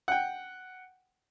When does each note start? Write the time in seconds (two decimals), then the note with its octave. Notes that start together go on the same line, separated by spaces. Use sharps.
0.08 F#5 G5